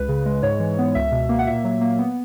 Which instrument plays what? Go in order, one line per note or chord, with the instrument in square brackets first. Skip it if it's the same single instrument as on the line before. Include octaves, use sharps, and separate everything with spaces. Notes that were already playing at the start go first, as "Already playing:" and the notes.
Already playing: [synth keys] C#2 B4
C#3
G#3
G#2 C#5
E3
B3
C#2 E5
B2
A#3
F#5
A#2 E5
F#3
A#3
B3